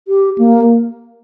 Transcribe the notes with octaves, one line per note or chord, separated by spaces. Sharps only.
G4
A#3